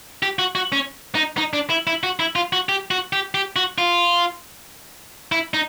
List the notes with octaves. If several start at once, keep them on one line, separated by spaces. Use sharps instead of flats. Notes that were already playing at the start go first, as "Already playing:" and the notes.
G4
F#4
F#4
C#4
D#4
D#4
D4
E4
E4
F#4
E4
F4
F#4
G4
F#4
G4
G4
F#4
F4
E4
D#4